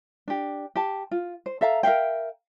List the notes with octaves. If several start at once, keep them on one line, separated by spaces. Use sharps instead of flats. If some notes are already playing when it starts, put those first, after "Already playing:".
D4 G4
G4 A5
F4
C5
A4 E5 F5 A#5
A#4 E5 F5 G5